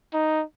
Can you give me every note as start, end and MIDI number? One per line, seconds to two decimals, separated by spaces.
0.13 0.43 63